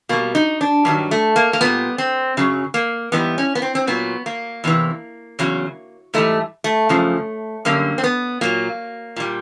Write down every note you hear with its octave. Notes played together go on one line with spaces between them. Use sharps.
B2 G3 A#3
D#4
D4
G2 D#3 F#3
A3
A#3
A#3
A#2 G3 B3
C4
F#2 C#3 F#3
A#3
G#2 E3 G3 B3
C#4
B3
C4
C4
A#2 F#3 B3
A#3
E2 C3 E3
E2 C#3 F#3
G#2 E3 G3 A3
A3
F#2 C#3 F3
F#2 D3 G3 A#3
C4
B3
A#2 F#3 A#3
A#2 G3